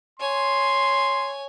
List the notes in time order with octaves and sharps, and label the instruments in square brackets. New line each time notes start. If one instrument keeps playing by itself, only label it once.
[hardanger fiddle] C#5 G#5 [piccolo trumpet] C6